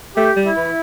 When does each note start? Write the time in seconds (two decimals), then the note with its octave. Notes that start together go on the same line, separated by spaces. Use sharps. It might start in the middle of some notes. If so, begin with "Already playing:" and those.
0.16 A3 G4
0.36 G3
0.46 E4
0.57 E3